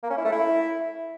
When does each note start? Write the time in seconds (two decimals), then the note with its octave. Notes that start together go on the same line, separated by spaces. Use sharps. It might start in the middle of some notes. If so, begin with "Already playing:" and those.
0.03 A#3
0.10 C#4
0.18 E4
0.25 A3
0.32 E4